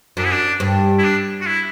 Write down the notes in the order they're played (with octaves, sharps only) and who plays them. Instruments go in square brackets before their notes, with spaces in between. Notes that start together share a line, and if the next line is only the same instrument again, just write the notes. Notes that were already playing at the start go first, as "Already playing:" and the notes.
[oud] F#2 [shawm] D4
[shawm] E4
D4
[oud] G2
[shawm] E4
D4
F#4
E4